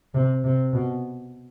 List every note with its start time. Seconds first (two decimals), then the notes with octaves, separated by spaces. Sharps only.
0.14 C3
0.44 C3
0.73 B2